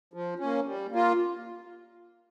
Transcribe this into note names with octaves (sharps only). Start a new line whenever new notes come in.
F3
A#3 C#4
G3
A#3 F4